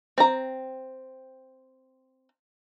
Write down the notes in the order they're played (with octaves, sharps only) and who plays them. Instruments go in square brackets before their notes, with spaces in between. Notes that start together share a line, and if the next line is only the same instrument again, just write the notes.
[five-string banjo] C4 A#5